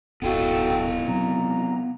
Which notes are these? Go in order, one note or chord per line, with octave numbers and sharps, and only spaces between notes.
D1 G#1 B3 E4 F#4 A4 F5 G5
C3 F#3 C4 A#5